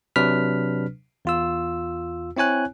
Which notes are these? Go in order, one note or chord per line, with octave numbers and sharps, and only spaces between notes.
C3 F#3 D4 B4 F6 B6
E2 F4 E6
C4 E4 C#5 G#5 F#6